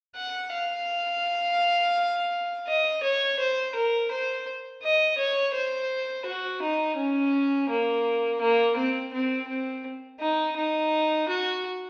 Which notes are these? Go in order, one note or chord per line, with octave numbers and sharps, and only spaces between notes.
F#5
F5
D#5
C#5
C5
A#4
C5
D#5
C#5
C5
F#4
D#4
C#4
A#3
A#3
C4
C4
C4
D#4
D#4
F#4